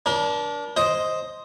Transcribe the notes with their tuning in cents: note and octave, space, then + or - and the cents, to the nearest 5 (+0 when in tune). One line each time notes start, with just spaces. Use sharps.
D4 -15 A#4 +40
C5 +0 D#5 +5